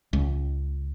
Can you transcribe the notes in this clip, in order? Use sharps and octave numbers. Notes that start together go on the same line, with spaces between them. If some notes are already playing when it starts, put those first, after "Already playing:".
C#2